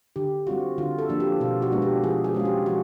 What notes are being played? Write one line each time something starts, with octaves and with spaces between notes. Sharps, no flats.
D3 G4
G3 C4 F4 F#4
D3 F4
A4
F3 A#3 D4
G4
B2 F4
F#4
G#3 B3 D4
G4
F3 G#4
G#4
G#3 C#4 F4
G4
F3 F#4